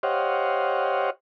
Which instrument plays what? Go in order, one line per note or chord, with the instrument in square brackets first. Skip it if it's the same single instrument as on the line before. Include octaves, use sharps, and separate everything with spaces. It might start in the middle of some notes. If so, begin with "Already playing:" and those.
[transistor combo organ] G4 C5 C#5 D#5 F5 F#5